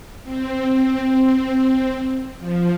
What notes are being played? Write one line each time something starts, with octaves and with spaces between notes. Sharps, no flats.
C4
F3